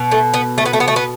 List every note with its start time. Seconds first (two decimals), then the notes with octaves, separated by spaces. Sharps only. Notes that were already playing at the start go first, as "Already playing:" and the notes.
Already playing: B2
0.11 A3
0.34 B3
0.58 A3
0.65 B3
0.73 A3
0.80 B3
0.88 A3
0.96 B3